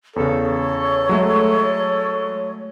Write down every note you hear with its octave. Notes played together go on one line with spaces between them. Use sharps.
E2 C#3 A4 C#5
F#3 G#3 A3